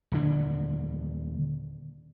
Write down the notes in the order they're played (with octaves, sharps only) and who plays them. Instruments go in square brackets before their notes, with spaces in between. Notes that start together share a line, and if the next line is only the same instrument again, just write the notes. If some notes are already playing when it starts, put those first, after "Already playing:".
[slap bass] D#1 D3 D4